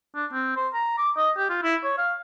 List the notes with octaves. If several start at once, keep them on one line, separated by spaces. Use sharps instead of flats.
D4
C4
C5
A#5
D6
D#5
G4
F4
E4
C#5
F5